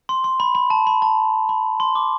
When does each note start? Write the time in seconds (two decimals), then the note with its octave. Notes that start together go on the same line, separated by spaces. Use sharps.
0.09 C6
0.24 C6
0.40 B5
0.55 B5
0.70 A5
0.87 B5
1.02 A5
1.49 B5
1.80 C6
1.95 D6